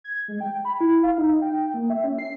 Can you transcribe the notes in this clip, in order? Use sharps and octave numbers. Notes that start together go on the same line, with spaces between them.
G#6
G#3
G5
B5
E4
F5
D#4
G5
A#3
E5
C#4
C7